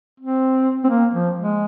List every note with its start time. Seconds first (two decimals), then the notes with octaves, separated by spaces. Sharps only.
0.20 C4
0.84 C4
0.89 A#3
1.13 F3
1.37 G#3